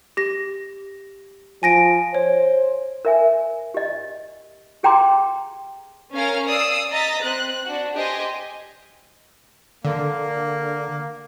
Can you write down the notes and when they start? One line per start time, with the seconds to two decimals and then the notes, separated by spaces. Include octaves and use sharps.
0.17 G4 A#6
1.63 F3 G#5 A#6 D7
2.15 C5 C#5
3.05 A#4 E5 G#5
3.74 G4 D#5
4.83 G4 G#4 G5 A#5 C6 D6
6.14 C#4 A#4 F5 F6
6.47 D5 F5 D#6 E6 C7
6.91 D#5 A#5 D#6 A6 B6
7.22 C4 F#6
7.65 D4 F#4
7.95 G4 C5 D#5 G#5
9.85 D3 A#3